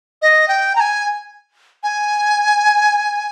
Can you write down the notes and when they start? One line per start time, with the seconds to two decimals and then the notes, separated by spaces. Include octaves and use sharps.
0.22 D#5
0.48 G5
0.76 A#5
0.80 G#5
1.83 G#5